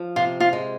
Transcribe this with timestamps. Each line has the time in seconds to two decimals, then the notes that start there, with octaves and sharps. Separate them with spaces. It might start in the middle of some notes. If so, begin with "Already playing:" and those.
Already playing: F3
0.16 C3 F4
0.40 F4
0.53 G#3